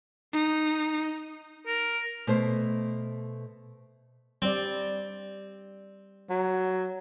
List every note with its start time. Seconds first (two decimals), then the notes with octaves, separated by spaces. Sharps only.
0.33 D#4
1.67 A#4
2.27 B2 A3 C5
4.42 G3 C4 D5
6.30 F#3